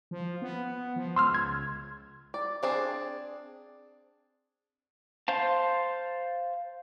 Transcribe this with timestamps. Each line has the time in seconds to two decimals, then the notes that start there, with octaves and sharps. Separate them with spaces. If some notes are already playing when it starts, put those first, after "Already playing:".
0.11 F3
0.42 B3
0.96 F3
1.16 C#2 C6 E6 F6
1.34 G#6
2.34 D5
2.63 C4 D4 G#4
5.28 C5 F5 A5